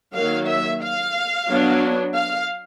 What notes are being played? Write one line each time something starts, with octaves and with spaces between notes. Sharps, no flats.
D#3 F#3 A#3 F5
E5
F5
F#3 B3 D4
F5